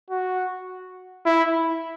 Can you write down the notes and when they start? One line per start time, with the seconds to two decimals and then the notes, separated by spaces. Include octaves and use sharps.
0.10 F#4
1.26 E4